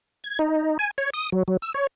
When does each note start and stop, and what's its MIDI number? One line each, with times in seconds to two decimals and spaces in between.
0.24 0.39 92
0.39 0.77 63
0.79 0.91 80
0.98 1.10 73
1.14 1.30 87
1.32 1.43 54
1.48 1.57 54
1.62 1.73 88
1.74 1.87 73